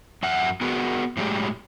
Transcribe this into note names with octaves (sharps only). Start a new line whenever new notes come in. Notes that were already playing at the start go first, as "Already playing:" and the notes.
F#2 E5 F#5
B3 F#4 G#4 A#4
A2 F#3 G#3 G4